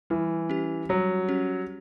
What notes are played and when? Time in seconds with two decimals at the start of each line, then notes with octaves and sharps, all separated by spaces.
0.10 E3 G3
0.49 C#4 G4
0.89 F#3 G3
1.29 C#4 G4